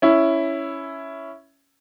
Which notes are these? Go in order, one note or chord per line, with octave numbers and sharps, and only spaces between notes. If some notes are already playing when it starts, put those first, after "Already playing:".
C#4 E4